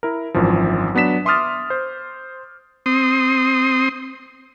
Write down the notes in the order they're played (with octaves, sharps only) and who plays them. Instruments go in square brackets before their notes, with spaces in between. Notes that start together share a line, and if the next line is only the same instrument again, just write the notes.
[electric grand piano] E4 A#4
G#1 F#2 E3 F3
F#3 B3 D4 B6 E7
E5 C6 D6 D#6 F6 A6
C5
[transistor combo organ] C4 C6 D#6